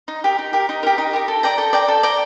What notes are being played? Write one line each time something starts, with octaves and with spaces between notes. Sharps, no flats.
D#4
G4 A#4
D#4
G4 A#4
D#4
G4 A#4
D#4
G4 A#4
A4
D5 G5 A#5
A4
D5 G5 A#5
A4
D5 G5 A#5